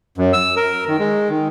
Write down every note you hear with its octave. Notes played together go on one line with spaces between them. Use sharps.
F#2
E6
A#4
D#3
G#3
D#3